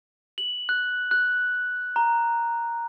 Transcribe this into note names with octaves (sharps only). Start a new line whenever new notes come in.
F#7
F#6
F#6
A#5